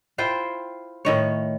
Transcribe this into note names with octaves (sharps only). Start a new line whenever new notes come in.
E4 F4 C5 G5
A2 D#3 C#5